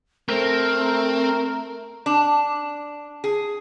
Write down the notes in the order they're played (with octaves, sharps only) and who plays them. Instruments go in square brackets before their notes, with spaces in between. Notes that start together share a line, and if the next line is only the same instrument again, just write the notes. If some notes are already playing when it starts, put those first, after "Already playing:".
[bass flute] A3 [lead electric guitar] C4 [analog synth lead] A#4
[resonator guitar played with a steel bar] D4
G#4